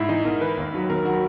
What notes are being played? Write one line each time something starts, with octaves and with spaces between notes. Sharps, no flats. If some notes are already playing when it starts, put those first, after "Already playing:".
Already playing: G#2 E4
E3 D#4
G#2 A#4
E3 B4
D#2
D#3 F#3
D#2 A#4
D#3 F#3 F#4